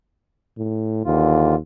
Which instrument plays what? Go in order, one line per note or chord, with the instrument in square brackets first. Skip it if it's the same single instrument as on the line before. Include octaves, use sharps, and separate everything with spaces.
[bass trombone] A2
[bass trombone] D#2 [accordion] D3 E3 F4